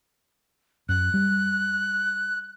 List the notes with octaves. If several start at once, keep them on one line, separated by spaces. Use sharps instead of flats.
F#2 F#6
G3